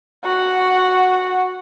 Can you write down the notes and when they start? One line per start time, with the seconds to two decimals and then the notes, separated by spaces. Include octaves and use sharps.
0.24 F#4 F#5